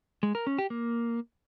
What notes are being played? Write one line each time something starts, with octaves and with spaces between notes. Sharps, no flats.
G#3
A#4
C#4
G4
A#3